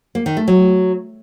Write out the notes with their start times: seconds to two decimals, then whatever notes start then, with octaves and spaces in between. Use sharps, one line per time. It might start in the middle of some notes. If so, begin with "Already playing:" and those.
0.15 A#3
0.26 D#3
0.37 A3
0.48 F#3